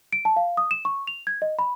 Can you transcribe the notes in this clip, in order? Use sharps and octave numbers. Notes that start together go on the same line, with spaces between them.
D7
A5
F5
D#6
E7
C#6
F7
G#6
D#5
B5